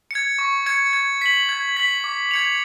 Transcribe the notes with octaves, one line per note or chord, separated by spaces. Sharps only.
G#6 C#7
C#6
G#6 C#7
G#6
B6 F#7
G#6
B6 F#7
D6
G#6 C#7 F7